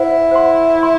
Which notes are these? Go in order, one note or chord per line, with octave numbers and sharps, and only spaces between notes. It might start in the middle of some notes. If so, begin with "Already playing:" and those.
Already playing: E4 C5 F#5
C5 F#5 C6
C6